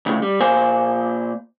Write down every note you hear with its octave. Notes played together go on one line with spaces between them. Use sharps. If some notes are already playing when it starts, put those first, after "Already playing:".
D2 A2 C#3
G3
A#2 A#3 C5 G#5